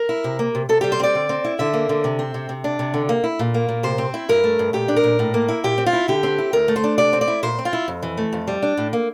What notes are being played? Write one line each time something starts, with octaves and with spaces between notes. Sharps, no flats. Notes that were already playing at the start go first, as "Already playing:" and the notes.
Already playing: A#4
E4
C3
A#3
C3
C3 A4
G3 G4
C5
C4 D5
D3
C4
E4
D3 E5
A#3
D3
C3
C4
C3
C3
D4
C3
D3
A#3
E4
A#2
A#3
A#2
C3 C5
C4
E4
G2 A#4
A3
G2
A#2 G4
D4
A#4
A#2
A2
A#3
E4
A#2 G4
C4
F4
E4
D3 G4
C4
E4
D2 A#4
A3
C5
D4
C3 D5
C4
D5
E4
A#2 C5
C4
F4
E4
F2
E3
A3
F2
G3
D4
A2
A#3